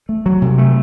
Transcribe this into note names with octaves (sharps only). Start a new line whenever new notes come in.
A3
F#3
C3
A3